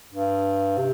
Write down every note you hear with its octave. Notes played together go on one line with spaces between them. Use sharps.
G2
C3